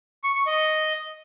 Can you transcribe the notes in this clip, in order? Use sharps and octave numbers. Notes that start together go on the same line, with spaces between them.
C#6
C#6
D#5